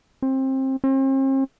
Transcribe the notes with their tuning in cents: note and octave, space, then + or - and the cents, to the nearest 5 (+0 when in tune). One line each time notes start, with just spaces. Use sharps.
C4 +25
C4 +45